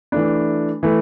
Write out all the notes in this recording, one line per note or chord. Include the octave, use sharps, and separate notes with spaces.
E3 A3 D4
E3 A3